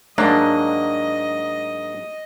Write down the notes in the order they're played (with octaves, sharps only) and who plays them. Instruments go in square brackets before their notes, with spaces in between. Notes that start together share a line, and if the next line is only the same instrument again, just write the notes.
[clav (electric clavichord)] G#2 F#3 A#3 [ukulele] D4 [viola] D#5